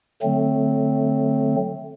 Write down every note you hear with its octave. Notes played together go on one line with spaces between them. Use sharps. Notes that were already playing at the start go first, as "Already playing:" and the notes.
D3 F#3 A3 C4